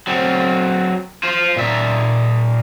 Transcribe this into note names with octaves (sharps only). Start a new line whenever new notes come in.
F#3 C4
F4 C5
A#2 E5